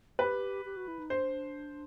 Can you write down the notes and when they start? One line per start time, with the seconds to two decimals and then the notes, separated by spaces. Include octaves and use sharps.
0.19 G4 B4
0.65 G4
0.77 F#4
0.88 E4
0.99 D#4
1.10 D4 C5